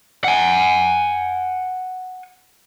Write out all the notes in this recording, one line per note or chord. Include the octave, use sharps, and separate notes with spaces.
F#5 G#5